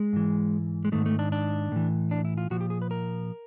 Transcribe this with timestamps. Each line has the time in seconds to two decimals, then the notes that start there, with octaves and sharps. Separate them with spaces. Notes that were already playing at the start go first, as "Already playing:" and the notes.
Already playing: G#3
0.13 G#2 E3
0.85 G#3
0.92 G#2 D#3 A3
1.06 A3
1.19 D4
1.32 D4
1.72 A2 E3
2.11 D4
2.25 E4
2.38 F4
2.50 A#2 F3 F#4
2.61 G4
2.70 G#4
2.82 B4
2.91 A#4